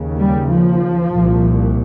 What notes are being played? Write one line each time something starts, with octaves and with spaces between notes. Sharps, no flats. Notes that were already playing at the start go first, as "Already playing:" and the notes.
Already playing: D#2 C#3
G3
F3
C2 A#2